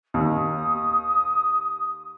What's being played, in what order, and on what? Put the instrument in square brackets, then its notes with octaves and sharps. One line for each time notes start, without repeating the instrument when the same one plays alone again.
[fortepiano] D#2 [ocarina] D#6